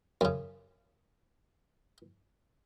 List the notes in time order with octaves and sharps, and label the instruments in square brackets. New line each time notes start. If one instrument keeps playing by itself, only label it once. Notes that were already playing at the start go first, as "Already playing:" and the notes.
[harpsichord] F#2 C#3